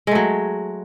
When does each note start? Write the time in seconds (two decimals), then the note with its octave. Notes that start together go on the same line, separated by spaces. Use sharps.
0.07 G#3
0.11 A3
0.15 F#3